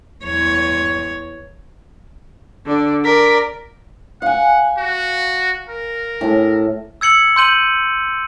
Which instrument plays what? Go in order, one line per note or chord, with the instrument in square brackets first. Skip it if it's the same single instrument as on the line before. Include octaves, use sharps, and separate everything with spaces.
[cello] E2 C#5
[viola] D3 D5
[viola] A#4 D5 [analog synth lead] B6
[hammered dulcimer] F5 G#5 [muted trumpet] F#5
[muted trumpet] F#4
A#4
[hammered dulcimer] A2 A4
[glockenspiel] E6 G#6 C#7 F#7
C6 G6 D#7 F#7